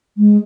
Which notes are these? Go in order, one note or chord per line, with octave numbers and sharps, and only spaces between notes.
G#3